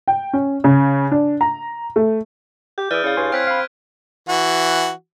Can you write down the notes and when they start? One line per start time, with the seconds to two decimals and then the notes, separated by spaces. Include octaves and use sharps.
0.08 G5
0.33 C#4
0.64 C#3
1.11 D4
1.41 A#5
1.96 A3
2.78 G4 G6
2.91 E3 G#4 D5 F6 G6 D#7
3.04 C#3 E4 F5
3.17 G2 C#5 G#5 C6
3.32 C4 F6 F#6 G#6 B6 D7
3.47 F5 B5
4.29 E3 F#4